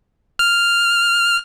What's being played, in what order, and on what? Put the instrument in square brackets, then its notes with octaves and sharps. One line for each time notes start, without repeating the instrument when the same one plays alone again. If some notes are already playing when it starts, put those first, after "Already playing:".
[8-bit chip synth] F6